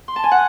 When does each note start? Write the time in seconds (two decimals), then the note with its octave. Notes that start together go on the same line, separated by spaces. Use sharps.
0.08 C6
0.16 A5
0.24 G#5
0.31 F#5